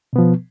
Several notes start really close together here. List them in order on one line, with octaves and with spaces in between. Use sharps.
B2 B3 F3